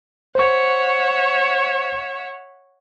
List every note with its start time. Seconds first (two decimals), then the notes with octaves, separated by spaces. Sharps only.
0.35 C5 C#5 E5 F#5 C#6